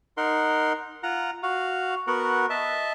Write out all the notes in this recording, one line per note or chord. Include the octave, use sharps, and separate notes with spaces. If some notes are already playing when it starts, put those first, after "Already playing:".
D#4 A#4 F#5 C6
F4 F#5 A#5
F#4 F5
B3 F#4 A#4 F#5
D#5 E5 A5